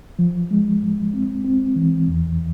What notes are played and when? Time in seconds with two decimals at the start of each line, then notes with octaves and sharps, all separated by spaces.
0.19 F3
0.51 G#3
0.82 G#2
1.14 C4
1.45 C4
1.76 E3
2.08 E2